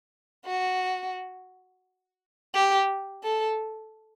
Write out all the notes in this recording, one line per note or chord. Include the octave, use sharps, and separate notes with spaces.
F#4
G4
A4